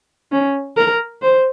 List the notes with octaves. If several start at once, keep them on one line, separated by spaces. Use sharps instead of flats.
C#4
A#4
C5